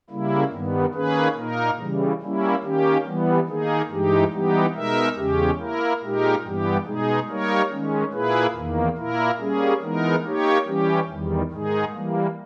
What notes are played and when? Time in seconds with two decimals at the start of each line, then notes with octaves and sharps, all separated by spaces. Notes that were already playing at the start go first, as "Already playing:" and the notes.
0.10 C#3 G3 A#3 E4
0.52 G2 D#3 G3 B3
0.94 D#3 A#3 C#4 G#4 B4
1.37 A#2 A#3 D#4 A#4
1.79 C#3 E3 G3
2.21 G3 A#3 C#4 E4
2.64 D#3 A#3 C#4 G4
3.06 E3 G3 B3
3.48 D#3 A#3 D#4 G#4
3.90 G2 E3 G#3 D#4 G4
4.32 E3 G3 B3 D#4 G4
4.75 B2 G#3 D#4 A#4 E5
5.17 E2 C#3 G#3 C#4 G4
5.59 A#3 E4 A#4
6.02 A#2 G#3 D#4 G4 A#4
6.44 G2 E3 G3 B3 G4
6.86 B2 G#3 D#4 G#4
7.28 G3 A#3 D#4 A#4 C#5
7.71 D#3 G#3 C#4
8.13 A#2 A#3 E4 G#4 B4
8.55 E2 D#3 A#3
8.97 A#2 A#3 E4 A#4
9.39 G3 A#3 C#4 G#4
9.82 E3 G#3 B3 D#4 A#4
10.24 A#3 D#4 G4 C#5
10.66 E3 G3 C#4 G4
11.09 E2 D#3 G3
11.51 G#2 D#3 G#3 D#4 G#4
11.93 E3 G3 A#3